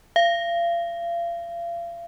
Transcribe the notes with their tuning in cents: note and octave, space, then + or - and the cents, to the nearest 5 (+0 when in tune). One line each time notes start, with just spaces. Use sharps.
F5 -35